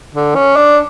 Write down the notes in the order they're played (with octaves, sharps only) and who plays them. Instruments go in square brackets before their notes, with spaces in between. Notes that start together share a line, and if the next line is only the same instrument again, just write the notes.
[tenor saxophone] D3
C#4
D4